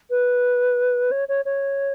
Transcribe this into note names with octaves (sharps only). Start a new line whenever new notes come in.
B4
C#5
C#5
C#5